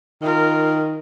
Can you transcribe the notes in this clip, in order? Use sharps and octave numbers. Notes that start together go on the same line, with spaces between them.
D#3 F4 A#4